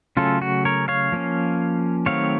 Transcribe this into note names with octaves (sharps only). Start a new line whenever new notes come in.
C#3 F#3 A3 C#4 F4 A4
F#4
A#4 C#5
C#5 F5
F3 A#3 C#4
D#3 F#3 A3 C4 C#5 F5